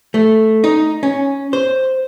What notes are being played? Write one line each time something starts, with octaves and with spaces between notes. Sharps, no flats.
A3
D#4
C#4
C5